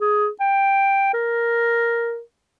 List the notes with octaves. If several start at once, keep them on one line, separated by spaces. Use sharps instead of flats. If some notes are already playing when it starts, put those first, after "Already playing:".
G#4
G5
A#4